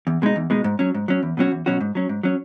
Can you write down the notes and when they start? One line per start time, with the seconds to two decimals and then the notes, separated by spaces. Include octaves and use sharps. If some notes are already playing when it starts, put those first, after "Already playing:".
0.07 E2
0.22 B2 G#3 D#4
0.36 E2
0.50 B2 G#3 D#4
0.64 G#2
0.79 F#3 C#4
0.94 G#2
1.08 F#3 C#4
1.23 E2
1.37 B2 F#3 C#4 F#4
1.52 E2
1.66 B2 F#3 C#4 F#4
1.81 G#2
1.95 F#3 C#4
2.09 G#2
2.23 F#3 C#4